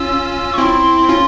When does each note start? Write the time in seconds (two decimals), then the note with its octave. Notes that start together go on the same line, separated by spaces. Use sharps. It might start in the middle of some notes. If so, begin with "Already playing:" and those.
Already playing: C#4 F4 E6
0.54 C#6
0.58 C4 E4 C6
1.09 C#4 F4